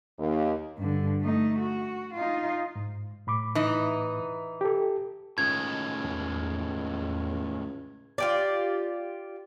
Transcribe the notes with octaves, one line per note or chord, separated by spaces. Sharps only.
D#2
G2 D3
A3 D#4
F#4
D#4 F4
G#2
A2 B5 D6
E3 D#4
G4 A4
C#2 A2 D#3 G#3 G#6
E2
F4 G4 D5